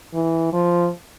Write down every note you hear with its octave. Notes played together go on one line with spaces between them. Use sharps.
E3
F3